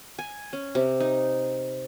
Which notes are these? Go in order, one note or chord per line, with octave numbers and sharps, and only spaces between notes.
G#5
C#4
C3
D#4